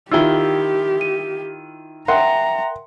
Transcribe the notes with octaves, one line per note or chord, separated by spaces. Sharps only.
D#3 E4 F4 G4 E6 G7
D#7
A#4 E5 F#5 G5 A#5 C6